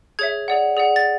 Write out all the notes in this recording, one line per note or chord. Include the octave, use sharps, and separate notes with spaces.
G#4 C#5 E5 G#6
G#4 D5 F#5
G#4 D5 F#5
A6